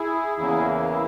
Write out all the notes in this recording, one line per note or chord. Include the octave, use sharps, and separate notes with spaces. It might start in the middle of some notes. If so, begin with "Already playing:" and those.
Already playing: E4 G#4
E2 C#3 E3 A#3 E4 G#4
E4